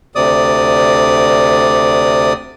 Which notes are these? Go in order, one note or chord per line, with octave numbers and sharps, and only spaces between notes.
D2 C3 D5 D#6